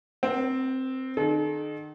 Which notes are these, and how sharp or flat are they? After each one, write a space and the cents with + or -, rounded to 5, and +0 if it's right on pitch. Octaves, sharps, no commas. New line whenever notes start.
C4 +0 B4 -45
D#3 -40 A4 -45